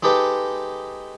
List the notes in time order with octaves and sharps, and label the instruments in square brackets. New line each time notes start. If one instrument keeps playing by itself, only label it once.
[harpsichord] G#3 D#4 G4 A4 B4